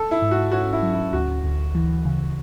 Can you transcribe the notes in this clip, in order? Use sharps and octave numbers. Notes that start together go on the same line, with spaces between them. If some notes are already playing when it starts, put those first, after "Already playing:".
Already playing: A4
E4
G#2
F#4
C#4 F#4
E4
F#3
E4
D2 F#4
D2
E3
C#3